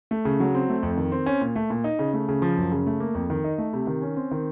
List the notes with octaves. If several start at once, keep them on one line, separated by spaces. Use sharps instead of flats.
A3
C#3
F#3
C4
A3
F2
D#3
C4
C#4
A#2
A3
A#2
D#4
C#3
A3
C#3
F3
F#2
C#3
A3
A#3
F2
D#3
D#4
A3
C3
D#3
C#4
C4
D#3